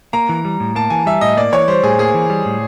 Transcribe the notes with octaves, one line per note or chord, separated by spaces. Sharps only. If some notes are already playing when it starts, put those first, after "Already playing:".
A#3 A#5
E3
G3
A2
A#3 A5
E3 G#5
G3 E5
A2 D#5
A#3 D5
E3 C#5
G3 C5
A2 G#4
A#3 G#4
E3
G3
A2